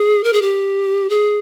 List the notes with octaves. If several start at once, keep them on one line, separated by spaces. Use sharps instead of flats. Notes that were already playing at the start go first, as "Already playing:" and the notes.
Already playing: G#4
A#4
G#4
G4
G#4